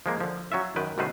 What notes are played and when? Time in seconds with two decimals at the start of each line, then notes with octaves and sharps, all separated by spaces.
0.06 F3 G#3 A#3
0.21 D3 F3
0.52 F#3 C#4 F4 E5
0.76 F#2 D#3 B4 G5
0.98 F#2 B2 D#3 A3 B4 C5